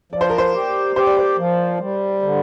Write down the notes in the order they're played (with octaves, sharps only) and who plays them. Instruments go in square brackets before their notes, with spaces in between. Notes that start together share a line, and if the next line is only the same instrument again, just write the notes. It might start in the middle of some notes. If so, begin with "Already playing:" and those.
[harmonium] F3 [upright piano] D5
[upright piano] C5
A#4
C5
[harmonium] G4
[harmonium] G4 [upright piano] C5
[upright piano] D5
C5
[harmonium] F3
G3
D3